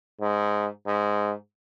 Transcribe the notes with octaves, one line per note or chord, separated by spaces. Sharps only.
G#2
G#2